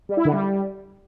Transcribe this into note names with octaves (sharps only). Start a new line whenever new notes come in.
G3
E4
D3
G3